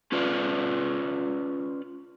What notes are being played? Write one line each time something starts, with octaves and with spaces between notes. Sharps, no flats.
C#4 F4 B4 D5